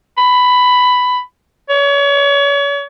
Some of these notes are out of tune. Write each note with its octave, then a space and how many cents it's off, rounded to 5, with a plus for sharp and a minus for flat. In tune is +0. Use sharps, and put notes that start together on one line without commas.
B5 +10
C#5 +35